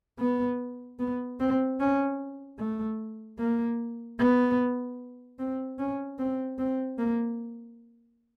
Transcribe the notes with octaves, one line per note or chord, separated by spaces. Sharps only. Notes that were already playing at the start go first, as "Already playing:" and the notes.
B3
B3
C4
C#4
A3
A#3
B3
C4
C#4
C4
C4
A#3